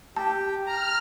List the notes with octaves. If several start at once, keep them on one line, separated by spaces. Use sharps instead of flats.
G4 A5
A#5 F6